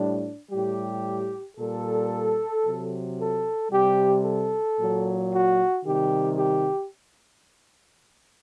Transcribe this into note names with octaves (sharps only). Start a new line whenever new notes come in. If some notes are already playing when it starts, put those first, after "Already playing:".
Already playing: A2 G3 D4
A2 G3 G4
A#2 G3 A4
C3 F#3
A4
C3 G3 G4
A4
A#2 F#3
F#4
C3 D#3 G3 G4
G4